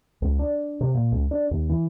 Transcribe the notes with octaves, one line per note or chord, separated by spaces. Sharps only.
C#2
D4
C3
A#2
C#2
D4
D#2
E3